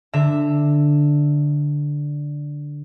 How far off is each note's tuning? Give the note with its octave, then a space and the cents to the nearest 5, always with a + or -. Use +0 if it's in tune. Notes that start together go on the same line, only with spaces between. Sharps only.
D3 +0 E5 +0 A#5 -35